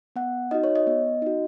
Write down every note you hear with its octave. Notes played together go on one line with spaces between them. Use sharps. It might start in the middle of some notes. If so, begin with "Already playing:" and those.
B3 F#5
D#4 F#4 D#5
C#5
D#5
B3
D#4 F#4